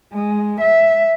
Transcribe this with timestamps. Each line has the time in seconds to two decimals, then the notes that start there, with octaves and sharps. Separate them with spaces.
0.13 G#3
0.61 E5